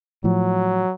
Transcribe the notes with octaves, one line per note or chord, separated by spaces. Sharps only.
A2 F3 F#3